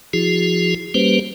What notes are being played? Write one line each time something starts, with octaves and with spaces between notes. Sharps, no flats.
F3 E4 F#4 G#4
G3 A#3 C#4 G4 B4 C5